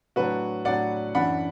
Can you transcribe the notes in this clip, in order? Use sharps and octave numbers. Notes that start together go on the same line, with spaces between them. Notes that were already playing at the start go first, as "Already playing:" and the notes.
A2 F#3 D4 F#4 B4
A2 F#3 D4 D5 F#5
F#2 E3 D4 F#5 B5